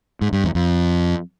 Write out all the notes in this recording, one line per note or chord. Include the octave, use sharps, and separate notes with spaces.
G#2
G2
E2
F2